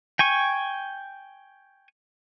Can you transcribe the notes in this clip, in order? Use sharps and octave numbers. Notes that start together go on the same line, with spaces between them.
G5 G#5 C#6